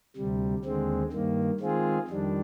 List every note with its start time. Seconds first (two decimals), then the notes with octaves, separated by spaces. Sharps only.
0.17 D2 C3 G3
0.65 D#2 D3 G#3 C4
1.12 G2 D#3 A#3
1.60 D#3 G#3 C4 F4 G#4
2.08 F2 D#3 G3 D4